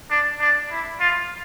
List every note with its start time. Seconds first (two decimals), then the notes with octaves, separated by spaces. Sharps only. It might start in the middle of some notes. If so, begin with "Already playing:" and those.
0.10 D4
0.40 D4
0.71 E4
1.00 F4